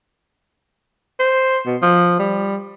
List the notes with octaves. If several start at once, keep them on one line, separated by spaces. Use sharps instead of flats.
C5
B2
F3
G3